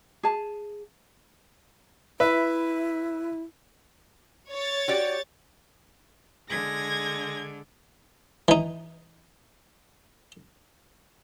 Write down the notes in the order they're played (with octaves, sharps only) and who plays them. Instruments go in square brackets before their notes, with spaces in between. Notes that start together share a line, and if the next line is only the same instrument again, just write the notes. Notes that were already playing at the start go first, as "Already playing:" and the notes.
[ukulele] G#4 A5
[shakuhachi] E4 [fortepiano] B4 E5
[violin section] C#5 A6
[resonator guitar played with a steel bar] F#4 G4 D5
[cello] D3 [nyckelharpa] G#3 [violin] G#6 [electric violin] A#6
[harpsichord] E3 D#4